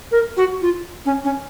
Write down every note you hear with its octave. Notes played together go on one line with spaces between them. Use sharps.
A#4
F#4
F4
C#4
C#4